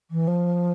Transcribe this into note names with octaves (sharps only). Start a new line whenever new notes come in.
E3
F3